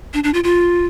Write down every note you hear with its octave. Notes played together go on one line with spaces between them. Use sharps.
D4
D4
F4
F4